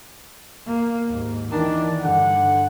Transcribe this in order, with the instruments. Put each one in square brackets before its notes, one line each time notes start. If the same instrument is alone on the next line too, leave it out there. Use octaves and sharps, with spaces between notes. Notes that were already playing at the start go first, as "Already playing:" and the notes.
[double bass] A#3
D#2 G#2
[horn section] D#3 D4 [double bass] E3
[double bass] G2 [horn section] D3 F#5